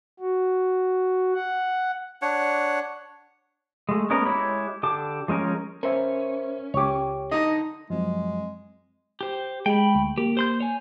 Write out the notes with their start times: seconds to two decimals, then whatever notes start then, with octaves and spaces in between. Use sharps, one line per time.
0.20 F#4
1.34 F#5
2.22 D4 C#5 F#5
3.89 G#3 A3
4.10 G#3 A3 B3 C#4 A#4
4.25 G#3 E4 G4 C#5 B5
4.83 D3 G4 A5 D6
5.28 F3 G#3 C#4 A#4
5.83 C#4 A#4 C5 E5
6.74 C#2 G4 C#5 D6
7.31 D3 D#4 D#5
7.90 F#2 F3 F#3 G#3 C4
9.21 G4 C5
9.66 G#3 G5 B5
9.95 D2
10.18 A#3 G4
10.37 C5 C6 G6
10.60 C#5 G#5